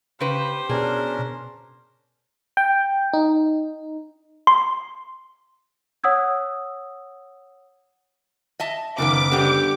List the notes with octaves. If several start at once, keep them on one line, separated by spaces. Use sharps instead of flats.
C#3 G4 B4 C5
B2 C#4 D4 G#4 A#4
G5
D#4
C6
C#5 F#5 D#6 E6 G#6
D#5 E5 A5
F#1 A#2 D#3 B3 D6
G2 D3 B3 G4